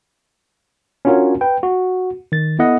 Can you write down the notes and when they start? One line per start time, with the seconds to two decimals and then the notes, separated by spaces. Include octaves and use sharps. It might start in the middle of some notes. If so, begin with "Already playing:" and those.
1.05 C#4 D4 F4 F#4 A#4 C#5
1.41 B4 G5
1.63 F#4
2.32 D#3 A6
2.59 B3 E4 A4 D#5 F#5